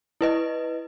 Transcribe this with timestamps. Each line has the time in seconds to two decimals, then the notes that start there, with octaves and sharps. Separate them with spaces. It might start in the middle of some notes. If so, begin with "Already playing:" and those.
0.21 E4 B4 D#5